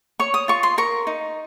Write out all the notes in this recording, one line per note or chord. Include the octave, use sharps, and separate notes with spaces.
C#5 C#6
D#6
F4 C#6
C6
A#4 C#6
D#4